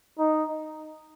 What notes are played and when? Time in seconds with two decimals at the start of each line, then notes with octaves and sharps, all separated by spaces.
0.19 D#4